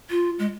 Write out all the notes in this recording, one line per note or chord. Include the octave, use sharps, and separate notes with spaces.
F4
G#3